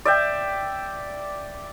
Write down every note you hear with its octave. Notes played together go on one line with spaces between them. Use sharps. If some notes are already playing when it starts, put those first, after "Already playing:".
D5 E5 G5